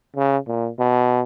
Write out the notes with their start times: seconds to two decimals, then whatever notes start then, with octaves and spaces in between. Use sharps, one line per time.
0.16 C#3
0.47 A#2
0.79 B2